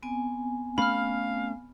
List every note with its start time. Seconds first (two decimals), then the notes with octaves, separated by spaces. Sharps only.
0.03 B3 C4 G#5
0.78 A3 C#4 F5 B5 F6